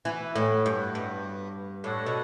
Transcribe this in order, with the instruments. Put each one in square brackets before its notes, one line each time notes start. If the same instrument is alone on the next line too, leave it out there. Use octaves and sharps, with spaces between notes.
[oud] E3 [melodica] B3 F#4 B4
[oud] A2
G2
G2
[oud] A2 [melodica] D4 A4 C#5 F#5
[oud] B2